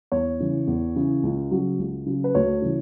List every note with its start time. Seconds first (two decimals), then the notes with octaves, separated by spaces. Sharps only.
0.12 E2 C#5
0.40 C#3 E3
0.67 E2
0.96 C#3 E3
1.23 C#2
1.51 C#3 F#3
1.78 C#2
2.06 C#3 F#3
2.24 B4
2.35 D2 C#5
2.62 C#3 E3